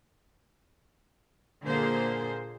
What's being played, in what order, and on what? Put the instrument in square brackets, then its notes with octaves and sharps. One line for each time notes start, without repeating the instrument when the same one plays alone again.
[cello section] A#2 D3 A#3 G#4 C5